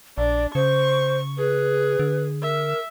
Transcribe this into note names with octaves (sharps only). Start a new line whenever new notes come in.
A#1 D4 D5
C#3 C5 C#6
G#4 B4
D3
A#4 E5